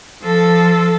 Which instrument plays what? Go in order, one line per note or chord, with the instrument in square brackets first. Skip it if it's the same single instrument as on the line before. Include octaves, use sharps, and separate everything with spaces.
[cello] F3 A4